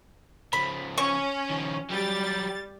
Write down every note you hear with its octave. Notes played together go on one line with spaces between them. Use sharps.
C#3 F3 B5
C#4 C#6
D#3 F3
F#3 G3 G4 A6